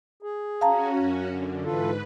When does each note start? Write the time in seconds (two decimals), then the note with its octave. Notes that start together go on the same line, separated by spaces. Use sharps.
0.22 G#4
0.61 C#4 F#4 F5 A5 A#5
0.97 F#2
1.29 D3
1.65 G#2 E3 F4 A4 B4